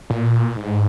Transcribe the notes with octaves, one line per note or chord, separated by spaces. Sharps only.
A#2
G#2